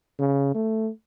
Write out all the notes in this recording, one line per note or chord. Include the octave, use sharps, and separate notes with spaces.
C#3
A3